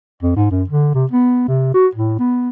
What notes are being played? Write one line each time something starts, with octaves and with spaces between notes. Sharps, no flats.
F2
G#2
F#2
D3
C3
B3
C3
F#4
A2
B3